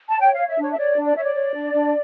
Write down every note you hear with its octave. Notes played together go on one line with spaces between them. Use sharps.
A5
C#5 G5
C#5 F5
E5
D4 C#5
E5
C#5 D5
D4
D5
C#5 E5
D5
C#5
D4
D4